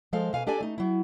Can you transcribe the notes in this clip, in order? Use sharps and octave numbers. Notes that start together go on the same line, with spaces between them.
F3 G#3 A4 C5 F5
B2 F5 G#5
D4 G4 A4 D5 G#5
A3 D#4
F#3 E4